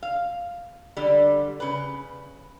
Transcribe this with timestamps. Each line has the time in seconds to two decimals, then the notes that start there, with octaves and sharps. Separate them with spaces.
0.03 F5
0.97 D3 G3
1.60 C#3 B4